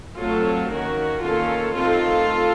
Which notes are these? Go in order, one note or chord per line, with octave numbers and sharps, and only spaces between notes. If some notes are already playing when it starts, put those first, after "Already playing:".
F#3 A3 C4 F4 A4
D#3 A#3 C#4 F#4 A#4
D#3 A#3 C#4 F4 A4
D#3 A3 C4 F4 A4